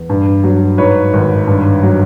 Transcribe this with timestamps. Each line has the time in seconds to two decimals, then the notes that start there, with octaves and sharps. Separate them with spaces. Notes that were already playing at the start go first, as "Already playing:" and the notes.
Already playing: E2
0.10 G2
0.44 F#3
0.78 G#2 B4 C#5
1.13 G#1
1.47 G2
1.83 F#3